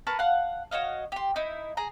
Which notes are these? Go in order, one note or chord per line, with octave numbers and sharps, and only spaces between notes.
A#4 B4 A5 C#6
F5 F#5
F#4 C#5 D#5 F5
G4 C6
D#4 E4
G#4 A#5